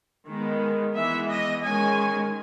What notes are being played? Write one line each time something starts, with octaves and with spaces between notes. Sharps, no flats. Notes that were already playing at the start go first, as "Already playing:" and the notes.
D#3 G#3 B3
E3 G#3 B3 E5
D#5
D#3 G#3 C#4 G#5